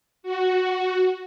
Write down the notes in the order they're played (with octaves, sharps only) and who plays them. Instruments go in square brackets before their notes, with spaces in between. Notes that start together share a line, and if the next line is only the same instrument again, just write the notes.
[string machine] F#4